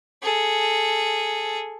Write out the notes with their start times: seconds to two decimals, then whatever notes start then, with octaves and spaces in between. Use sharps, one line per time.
0.23 G#4 A4